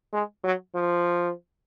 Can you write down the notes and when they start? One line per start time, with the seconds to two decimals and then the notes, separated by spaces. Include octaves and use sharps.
0.13 G#3
0.44 F#3
0.74 F3